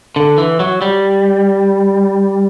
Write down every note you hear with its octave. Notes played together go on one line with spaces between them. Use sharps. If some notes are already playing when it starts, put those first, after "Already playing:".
D3
E3
F#3
G3